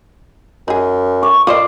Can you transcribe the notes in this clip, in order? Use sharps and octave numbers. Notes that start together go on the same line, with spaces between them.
F#2 D#4 G#4
C#6 D6
A#2 F4 C5 D5 D#5 F5